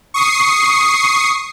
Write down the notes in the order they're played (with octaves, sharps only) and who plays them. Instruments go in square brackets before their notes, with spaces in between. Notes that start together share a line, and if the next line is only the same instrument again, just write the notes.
[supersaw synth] C#6 D#6 C7